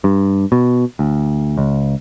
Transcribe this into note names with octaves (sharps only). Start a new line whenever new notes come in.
G2
B2
D2
C#2